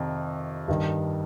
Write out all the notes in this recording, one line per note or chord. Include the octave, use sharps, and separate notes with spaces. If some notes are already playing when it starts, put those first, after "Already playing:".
Already playing: F2 C3 D#3
G2 D#3